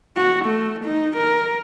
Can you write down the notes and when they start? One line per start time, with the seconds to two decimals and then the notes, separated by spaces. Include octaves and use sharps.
0.16 F#4
0.45 A3
0.85 D#4
1.17 A#4